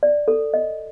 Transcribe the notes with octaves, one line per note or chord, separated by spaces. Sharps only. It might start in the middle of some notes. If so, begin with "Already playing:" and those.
D5
A4
D#5